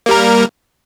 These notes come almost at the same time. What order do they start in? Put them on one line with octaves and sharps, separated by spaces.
A#3 G3 A#4